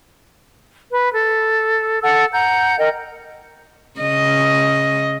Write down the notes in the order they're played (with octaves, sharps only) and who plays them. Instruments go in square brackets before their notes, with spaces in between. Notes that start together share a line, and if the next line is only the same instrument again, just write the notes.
[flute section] B4
A4
A4 F#5 A5 E6
F#5 A#5 G6
A#4 D#5 G5
[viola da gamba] C#3 D#5